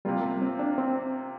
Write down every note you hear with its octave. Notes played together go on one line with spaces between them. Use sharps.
C3 G3 A#3 F4
C4
D4
C4